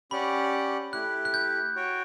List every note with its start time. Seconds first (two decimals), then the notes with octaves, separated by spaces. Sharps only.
0.11 C#4 G4 D5 F#5 B5
0.93 A3 E4 G4 F#6
1.25 F#6
1.34 G6
1.75 F#4 C#5 G5